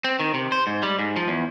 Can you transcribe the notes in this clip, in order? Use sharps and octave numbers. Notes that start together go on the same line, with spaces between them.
C4
D#3
C3
C5
G#2
G3
G#2
F3
E2